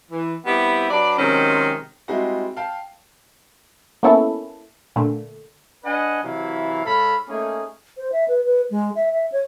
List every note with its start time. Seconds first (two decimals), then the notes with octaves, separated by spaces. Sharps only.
0.11 E3
0.46 G3 B3 C4 E4 G4
0.90 F#3 D4 B4 D5
1.18 C3 D#3 F#3 G#3 C4 C#4
2.08 G3 G#3 C4 D#4 E4 F#4
2.57 F5 G5 A5
4.03 A#3 B3 C#4 E4 A4
4.96 A#2 D3 A3
5.83 D4 B4 D#5 F#5 G#5
6.23 C3 E3 F#3 E4 F5
6.85 G#2 A4 C#5 F5 B5
7.29 A3 A#3 C#4 D#4 G#4
7.97 C5
8.12 E5
8.28 B4
8.45 B4
8.70 G#3
8.95 E5
9.12 E5
9.32 C#5